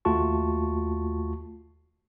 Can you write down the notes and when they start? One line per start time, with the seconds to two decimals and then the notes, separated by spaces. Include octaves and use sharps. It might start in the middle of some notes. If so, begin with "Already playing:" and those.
0.05 D#2 A3 F4 F#4 A5 C#6